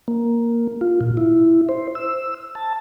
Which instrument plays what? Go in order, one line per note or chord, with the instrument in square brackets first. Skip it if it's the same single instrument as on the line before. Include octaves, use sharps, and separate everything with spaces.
[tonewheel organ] A#3
F4
A#2
E4
C5
E6
A5